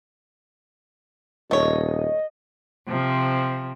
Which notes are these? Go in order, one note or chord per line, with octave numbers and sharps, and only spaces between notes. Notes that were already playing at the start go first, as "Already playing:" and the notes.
D#1 A3 C#5 D#5
C3 F3